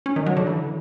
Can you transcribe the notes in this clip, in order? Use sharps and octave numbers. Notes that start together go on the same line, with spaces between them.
C#4
D#3
F#3
D3
E3